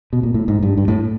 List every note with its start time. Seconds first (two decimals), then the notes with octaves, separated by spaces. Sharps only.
0.13 B2
0.23 A#2
0.34 A2
0.48 G#2
0.63 G2
0.77 G2
0.88 A2